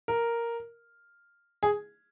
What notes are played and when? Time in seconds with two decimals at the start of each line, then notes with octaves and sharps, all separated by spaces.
0.08 A#4
1.63 G#4